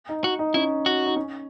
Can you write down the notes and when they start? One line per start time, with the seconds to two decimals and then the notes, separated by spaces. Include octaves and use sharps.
0.09 D#4
0.24 D#4 F#4
0.39 D#4
0.54 C#4 E4
0.85 D#4 F#4
1.06 D#4
1.16 C#4